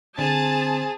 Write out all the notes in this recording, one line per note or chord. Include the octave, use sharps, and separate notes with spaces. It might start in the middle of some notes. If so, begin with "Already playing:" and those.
D3 C4 G#4 A5